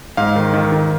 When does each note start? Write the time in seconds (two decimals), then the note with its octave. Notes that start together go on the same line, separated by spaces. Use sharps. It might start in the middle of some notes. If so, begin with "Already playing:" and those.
0.17 G#2 F5
0.36 D#3
0.53 D#3
0.72 D#3